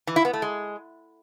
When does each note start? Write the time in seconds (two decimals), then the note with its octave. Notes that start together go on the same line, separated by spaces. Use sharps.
0.07 E3
0.16 E4
0.25 B3
0.33 A3
0.42 G#3